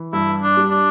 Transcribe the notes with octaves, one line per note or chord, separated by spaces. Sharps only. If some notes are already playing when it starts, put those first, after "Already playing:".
Already playing: E3
G2 E4
D4
G3
D4